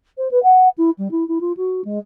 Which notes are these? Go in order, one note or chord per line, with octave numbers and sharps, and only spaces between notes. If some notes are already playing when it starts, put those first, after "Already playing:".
C5
B4
F#5
E4
G3
E4
E4
F4
F#4
G#3